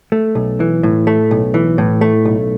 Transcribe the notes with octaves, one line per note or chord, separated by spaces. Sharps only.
A3
B1
E3
A2
A3
B1
E3
A2
A3
B1